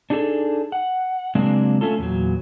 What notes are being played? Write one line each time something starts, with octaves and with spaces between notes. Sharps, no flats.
D4 D#4 F#4 G#4 A4
F#5
C#3 F#3 G#3 A#3 C4 D4
A3 C#4 F4 A4
E2 A#2 F#3